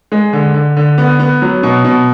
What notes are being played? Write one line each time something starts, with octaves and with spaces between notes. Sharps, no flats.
G#3
D3
D3
D3
B3
B3
F#3
B2
B2